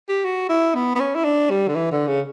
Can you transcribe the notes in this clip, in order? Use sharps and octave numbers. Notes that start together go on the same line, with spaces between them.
G4
F#4
E4
B3
B3
C#4
E4
D4
G3
D3
E3
D3
C#3